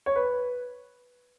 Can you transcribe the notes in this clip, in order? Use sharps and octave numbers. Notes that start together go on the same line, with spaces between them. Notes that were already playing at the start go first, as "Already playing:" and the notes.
C#5
B4